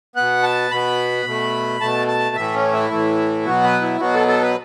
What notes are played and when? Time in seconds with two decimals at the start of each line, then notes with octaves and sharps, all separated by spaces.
0.16 B2 B3 F#5
0.43 A5
0.71 B2 B3 B5
1.26 B2 A3
1.81 B2 A3 A5
2.08 A5
2.36 A2 E3 A3 E5
2.54 C#4
2.73 E4
2.90 A2 E3 A3
3.45 B2 F#3 B3 F#4
3.64 B4
3.82 E4
4.00 B2 F#3 B3 F#4
4.14 A4
4.28 A4
4.42 B4